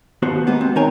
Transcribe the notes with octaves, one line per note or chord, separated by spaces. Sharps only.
D#2 B3 F#4 C5
G#3 A#3 B3
C4
D#3 D#4 A#4 C#5 G5 G#5